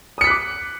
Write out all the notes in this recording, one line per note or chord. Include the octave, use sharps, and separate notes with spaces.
D6 D#6 F#6 B6 C#7